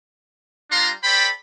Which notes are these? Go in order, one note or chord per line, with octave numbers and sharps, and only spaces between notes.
G3 D4 F4 F5 A#5 C6
A4 C5 D5 G5 B5